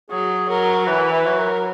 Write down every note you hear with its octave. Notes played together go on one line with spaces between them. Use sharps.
F#3 G#4
F#3 A#4
E3 B4
B4
F#3
A#4